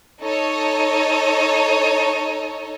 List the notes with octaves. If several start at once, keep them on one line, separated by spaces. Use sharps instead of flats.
D#4 A4 C#5